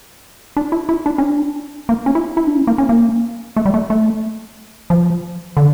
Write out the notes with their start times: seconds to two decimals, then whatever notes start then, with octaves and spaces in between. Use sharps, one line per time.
0.57 D4
0.72 E4
0.89 E4
1.06 D4
1.18 C#4
1.22 D4
1.89 A#3
2.06 C#4
2.15 E4
2.37 E4
2.47 D4
2.57 C#4
2.67 A#3
2.78 C#4
2.89 A#3
3.56 A3
3.65 G3
3.74 A3
3.90 A3
4.90 F3
5.57 D3